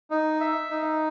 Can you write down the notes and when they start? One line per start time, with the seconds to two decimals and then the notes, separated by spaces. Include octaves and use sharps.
0.11 D#4
0.41 E5
0.70 D#4